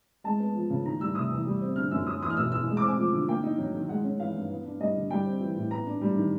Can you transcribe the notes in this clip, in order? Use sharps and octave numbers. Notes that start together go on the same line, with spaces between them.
G#3 A5
B3
F3
C#3
D#3 A#5
G3 E6
C3 D#6
E2
G3
C4
D3 F6
F#2 E6
F#3 D#6
E2 D#6
F6
B2 E6
E2 E6
G#3
D6
C4
G#5
F3
D3
A#3 G5
D#4
F#3
D#3
G#3 F#5
C#4
E3 F5
G2
B3
D4
G3 D#5
D3
G3 G5
C4
E3
A2
B3 A#5
D4
G3
D#3